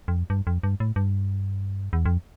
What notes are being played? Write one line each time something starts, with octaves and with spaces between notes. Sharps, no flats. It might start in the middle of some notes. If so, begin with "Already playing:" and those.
F2
G2
F2
G2
A2
G2
E2
F2